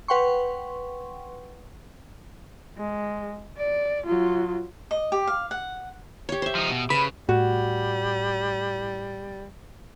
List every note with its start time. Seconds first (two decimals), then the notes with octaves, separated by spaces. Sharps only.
0.08 B4 F#5 G5 C6 C#6
2.78 G#3
3.57 D5
4.06 F#3 F4
4.91 D#5
5.12 G4
5.27 F5
5.51 F#5
6.29 G4 C#5
6.42 C5 E5
6.55 F3 D#4
6.70 B2
6.90 C#3 B4 B5
7.29 A2 G3 F#4